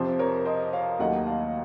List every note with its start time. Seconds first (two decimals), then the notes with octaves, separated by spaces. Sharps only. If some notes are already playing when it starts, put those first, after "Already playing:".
Already playing: F2 C3 F3 C4 C5
0.19 A#4 C#5
0.45 C5 D#5
0.73 C#5 F5
0.99 D#2 D#3 F#3 A3 D#5 F#5
1.27 F5 A5